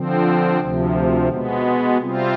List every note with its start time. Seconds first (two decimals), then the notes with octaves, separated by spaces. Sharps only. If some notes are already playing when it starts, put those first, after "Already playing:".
Already playing: D3 F3 C4
0.60 D2 C3 F3
1.28 B2 G#3 B3
1.98 C3 G3 C4 F4